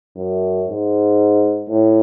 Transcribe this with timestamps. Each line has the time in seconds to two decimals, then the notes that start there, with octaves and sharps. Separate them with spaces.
0.17 F#2
0.68 G#2
1.69 A2